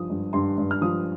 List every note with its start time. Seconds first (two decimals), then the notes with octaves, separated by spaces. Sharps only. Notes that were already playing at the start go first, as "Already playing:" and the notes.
Already playing: G2 F3 D#6
0.10 G2
0.33 G2 C6
0.58 G2
0.71 F6
0.82 F3 D#6